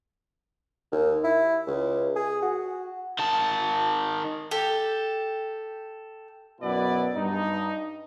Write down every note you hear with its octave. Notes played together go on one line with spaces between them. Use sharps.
D#2
E4
C#2
G#4
F#4
D#3 A5
G4 A4
F#2 B2 B3 E4 B4 D5
G2 D#4